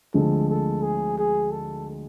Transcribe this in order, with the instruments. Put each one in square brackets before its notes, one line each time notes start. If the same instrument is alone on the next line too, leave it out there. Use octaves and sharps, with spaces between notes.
[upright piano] D2 D3 F3 G#3 C4 [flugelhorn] A4
[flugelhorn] A4
G#4
G#4
A4